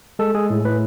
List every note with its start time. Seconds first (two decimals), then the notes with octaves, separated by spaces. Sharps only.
0.19 G#3 A4
0.34 G#3 G#4
0.50 A2
0.65 A2 B4